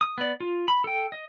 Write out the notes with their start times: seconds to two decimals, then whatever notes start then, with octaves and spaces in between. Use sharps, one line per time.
0.01 D#6
0.18 B3 D5
0.40 F4
0.68 B5
0.84 A4 G5
1.12 D#5